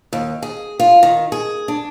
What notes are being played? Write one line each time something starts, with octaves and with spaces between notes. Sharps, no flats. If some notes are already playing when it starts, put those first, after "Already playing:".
D#2
G#4
F4
D#3
G#4
D4